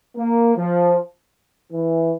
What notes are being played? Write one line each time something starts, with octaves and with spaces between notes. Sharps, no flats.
A#3
F3
E3